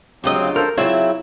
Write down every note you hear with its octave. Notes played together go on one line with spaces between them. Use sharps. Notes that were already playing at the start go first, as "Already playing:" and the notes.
D2 C#3 F#3 C4 F4 G4 D#5
A4 A#4 C5
C#3 F#3 C4 E4 F4 C#5 E5